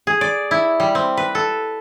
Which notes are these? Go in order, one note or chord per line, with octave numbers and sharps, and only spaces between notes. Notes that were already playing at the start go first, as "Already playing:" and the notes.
G#4
D5
E4
G3
C4
B4
A4